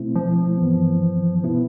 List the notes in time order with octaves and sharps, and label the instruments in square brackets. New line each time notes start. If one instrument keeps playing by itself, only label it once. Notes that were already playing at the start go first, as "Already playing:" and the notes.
Already playing: [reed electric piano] B2 A3 C4 E4
[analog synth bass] F3
[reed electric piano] G2 E3 B3
B2 B3 E4